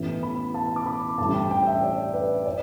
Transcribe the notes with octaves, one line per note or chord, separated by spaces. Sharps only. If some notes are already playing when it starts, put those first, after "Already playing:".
Already playing: A1 A2 E3 B3
B5
A5
D6
B5
A1 A2 G3 D4 A5
G5
G5
E5
D5
B4
D5